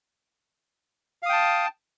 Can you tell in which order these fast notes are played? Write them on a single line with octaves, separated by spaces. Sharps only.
F5 D#6 G5 A5